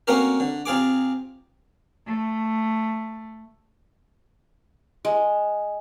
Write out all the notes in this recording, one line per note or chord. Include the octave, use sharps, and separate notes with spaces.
A3 A#3 C4 C#4 F#4 A#4
D3
C3 F4 G#4 D6
A3
G#3